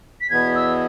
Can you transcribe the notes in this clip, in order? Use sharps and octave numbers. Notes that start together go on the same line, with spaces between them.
B6
E2 B2 B3 G#6
E6